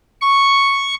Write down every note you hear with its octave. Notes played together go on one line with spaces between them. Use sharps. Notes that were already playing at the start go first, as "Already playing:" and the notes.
C#6